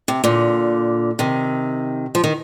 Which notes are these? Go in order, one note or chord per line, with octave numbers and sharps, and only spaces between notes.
C3
A#2 D3
C3 D#3
F3
D#3